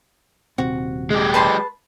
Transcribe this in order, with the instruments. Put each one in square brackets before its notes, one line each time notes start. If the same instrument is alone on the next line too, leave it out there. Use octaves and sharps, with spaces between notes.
[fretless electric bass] D#1 C3 C4 [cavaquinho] F#4
[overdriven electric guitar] G#3 G4
[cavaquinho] B4 A5 C6